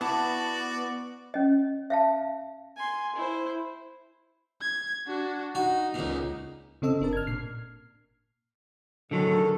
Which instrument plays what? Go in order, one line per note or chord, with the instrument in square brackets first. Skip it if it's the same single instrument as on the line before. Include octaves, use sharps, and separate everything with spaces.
[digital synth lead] B3 [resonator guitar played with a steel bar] E4 A5 [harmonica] F#4 D5
[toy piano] C#4 D#5
E5 F5 A5
[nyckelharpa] G#5 C6
E4 C5
[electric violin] G#6
D4 F#4
[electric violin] D#4 [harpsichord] F#4
[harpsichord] C#2 A#2
[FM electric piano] C#3 C4 A4 D#5 E6
G1 D4 A#4 A5
F6 G#6
A#2 F6 C7
[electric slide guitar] D3 F#3 [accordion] D#3 G#3 A4